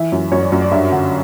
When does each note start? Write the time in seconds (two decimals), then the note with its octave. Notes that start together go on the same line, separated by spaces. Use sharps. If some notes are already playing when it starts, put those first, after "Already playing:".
Already playing: E3 E5
0.12 F#2
0.32 F#2 C#5
0.42 D5
0.52 F#2
0.61 D5
0.71 G2 E5
0.92 D3 F#5